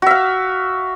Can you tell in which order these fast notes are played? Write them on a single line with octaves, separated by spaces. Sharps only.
F#4 E5 F5